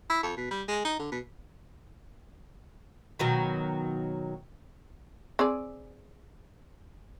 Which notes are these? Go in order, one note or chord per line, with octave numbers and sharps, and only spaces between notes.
E4
F2
B2
G3
G#3
D#4
D3
B2
B2 D#3 F#3
C4 G#4 D5